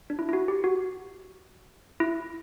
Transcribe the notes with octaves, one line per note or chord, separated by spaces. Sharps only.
D4
E4
E4
F#4
G4
F#4
E4